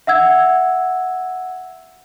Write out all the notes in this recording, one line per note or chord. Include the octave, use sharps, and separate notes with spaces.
E5 F#5 E6 G#6